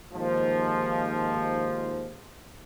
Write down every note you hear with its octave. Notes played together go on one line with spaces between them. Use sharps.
D#2 G#2 F3